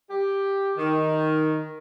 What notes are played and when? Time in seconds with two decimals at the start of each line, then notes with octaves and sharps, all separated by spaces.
0.10 G4
0.77 D#3